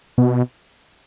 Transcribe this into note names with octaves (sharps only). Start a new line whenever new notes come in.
B2